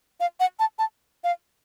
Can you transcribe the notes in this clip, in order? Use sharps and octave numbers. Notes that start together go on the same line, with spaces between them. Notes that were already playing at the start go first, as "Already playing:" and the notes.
F5
F#5
A5
A5
F5